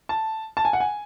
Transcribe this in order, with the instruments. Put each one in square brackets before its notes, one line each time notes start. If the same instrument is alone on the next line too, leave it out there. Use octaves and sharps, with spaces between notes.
[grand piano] A5
A5
G#5
F#5
G#5